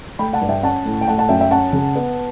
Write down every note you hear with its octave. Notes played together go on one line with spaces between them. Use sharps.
A3 G5 B5
F#5 A5
G2
E5 G5
C#4 F#5 A5
A2
G5
A3 F#5 A5
F#5 A5
F#2 E5 G5
E5 G5
C#4 F#5 A5
C#3
B3